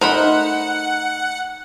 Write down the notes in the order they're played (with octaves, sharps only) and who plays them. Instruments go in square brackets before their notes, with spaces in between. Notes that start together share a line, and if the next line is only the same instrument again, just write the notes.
[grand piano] A3 D#4 [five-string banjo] A#4 C5 B5 [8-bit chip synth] F#5